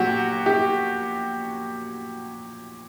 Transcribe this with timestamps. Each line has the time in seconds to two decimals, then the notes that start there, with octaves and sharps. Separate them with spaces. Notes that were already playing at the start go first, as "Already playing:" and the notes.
Already playing: A#2 F#3 F#4 G4
0.46 G4